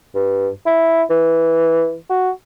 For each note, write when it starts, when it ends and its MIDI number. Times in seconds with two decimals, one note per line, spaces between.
0.15 0.48 43
0.66 1.02 64
1.10 1.95 52
2.09 2.30 66